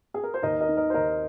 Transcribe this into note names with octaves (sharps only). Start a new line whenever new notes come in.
G#4
A#4
C5
D#2 A#4 D#5
A#4 D#5
D#3
A#4 D#5
C5
D#2 A#4 D#5